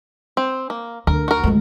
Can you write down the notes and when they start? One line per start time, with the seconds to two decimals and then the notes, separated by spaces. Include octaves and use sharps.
0.37 C4
0.70 A#3
1.07 D2 A#4
1.28 F#4 A#4
1.43 D2 G#3